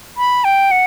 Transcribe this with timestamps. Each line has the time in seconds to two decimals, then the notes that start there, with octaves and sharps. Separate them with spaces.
0.17 B5
0.44 G5
0.71 F#5